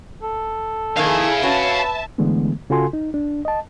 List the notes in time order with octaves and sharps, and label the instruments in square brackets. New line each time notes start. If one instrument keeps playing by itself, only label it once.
[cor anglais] A4
[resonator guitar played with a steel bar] F2 D#3 A#3 [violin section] E4 G#4 [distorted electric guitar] F5 G#5
[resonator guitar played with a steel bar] C#4 F#4 [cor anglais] B4 [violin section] E5 A5
[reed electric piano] D3 E3 G#3 A3 B3
C#3 F4 F#4 A4 G#5 C6
D#4
D4
D#5 A5